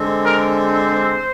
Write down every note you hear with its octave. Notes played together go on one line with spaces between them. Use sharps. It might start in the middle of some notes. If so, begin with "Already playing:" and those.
Already playing: D3 G#3 C4
A#4
C5